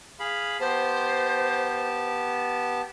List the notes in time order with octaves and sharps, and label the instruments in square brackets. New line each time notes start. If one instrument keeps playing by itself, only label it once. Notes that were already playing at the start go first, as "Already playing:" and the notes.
[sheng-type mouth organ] G#4 F5 B5
[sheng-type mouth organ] B3 G4 A5 [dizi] C5